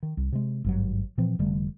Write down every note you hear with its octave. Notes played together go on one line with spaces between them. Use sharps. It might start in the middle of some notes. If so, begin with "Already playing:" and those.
D#3
C2
C3 G#3
G#1 G2 F#3
A#2 E3 F3 C4
F1 D3 G3 A3